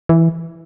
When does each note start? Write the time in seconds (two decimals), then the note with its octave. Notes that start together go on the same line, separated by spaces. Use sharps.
0.09 E3